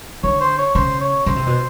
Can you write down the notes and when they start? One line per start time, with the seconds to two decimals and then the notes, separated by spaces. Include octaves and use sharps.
0.23 D3 C#5
0.41 C5
0.58 C#5
0.75 C#3 C5
1.01 C#5
1.26 C#3 C5
1.36 C3
1.47 B2